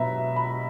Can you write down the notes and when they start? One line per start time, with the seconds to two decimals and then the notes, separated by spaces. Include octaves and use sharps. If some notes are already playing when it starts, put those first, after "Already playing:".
Already playing: B2 F#3 B3 E5 A#5 B5
0.36 B5